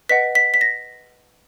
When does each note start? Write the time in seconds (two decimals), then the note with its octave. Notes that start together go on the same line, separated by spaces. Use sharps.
0.09 B4 D#5 F#5 B6
0.35 B6
0.54 B6
0.61 A#6